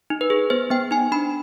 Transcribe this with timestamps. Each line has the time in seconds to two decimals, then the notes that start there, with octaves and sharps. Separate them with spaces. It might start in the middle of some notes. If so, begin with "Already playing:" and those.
0.10 D#4
0.21 B4
0.30 G#4
0.50 B3 C5
0.70 B3 G5
0.91 D#4 G#5
1.12 D4 B5